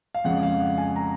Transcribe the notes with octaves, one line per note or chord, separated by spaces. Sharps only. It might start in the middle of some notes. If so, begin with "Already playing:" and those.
F5
F2 C#3 G#3 C#4 F#5
F5
F#5
G#5
A#5